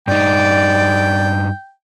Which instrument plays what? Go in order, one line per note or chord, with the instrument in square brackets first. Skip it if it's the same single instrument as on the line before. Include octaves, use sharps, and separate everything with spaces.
[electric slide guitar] G2 D#4 [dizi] D5 [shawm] G5